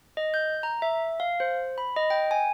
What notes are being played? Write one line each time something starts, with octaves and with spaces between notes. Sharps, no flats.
D#5
G6
A#5
E5
F5
C5
B5
D#5
G5
G#5